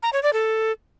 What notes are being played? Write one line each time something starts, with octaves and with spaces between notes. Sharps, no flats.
A#5
C#5
D5
A4